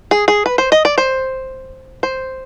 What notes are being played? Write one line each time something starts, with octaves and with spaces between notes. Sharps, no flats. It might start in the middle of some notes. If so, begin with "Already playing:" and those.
G#4
G#4
B4
C5
D#5
D5
C5
C5